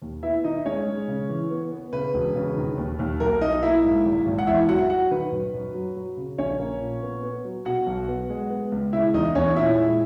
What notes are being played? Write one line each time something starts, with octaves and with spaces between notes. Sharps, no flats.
D#2
B3 E4 E5
D#3 D#4 D#5
G#3 C#4 C#5
G#3
C#3
E3
B3
B3
C#3 B4
E1
C#3
D#3
D#2
D#2
B1 A#4
B1 D#4 D#5
A#3 E4 E5
G#2
G#1
G#1
F#5
E2 E4 E5
F#3 F#4 F#5
F#3 F#4 F#5
D#3 B4
F#2
F#2
F#3
F#3
C#3
A#1 C#4 C#5
A#3
A#2
B3
B3
F#3
B2 F#4 F#5
B1
B3
G#3
B3
C#2
C#3 E4 E5
E2 D#4 D#5
E2 C#4 C#5
A#2 E4 E5
G#3